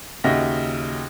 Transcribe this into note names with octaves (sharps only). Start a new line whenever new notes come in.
D#2 C#3 D#4 F#4 E5 A#6